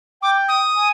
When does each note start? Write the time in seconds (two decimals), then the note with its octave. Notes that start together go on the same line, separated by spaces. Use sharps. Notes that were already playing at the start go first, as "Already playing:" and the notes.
0.22 G5 D6
0.48 D#6
0.76 G#5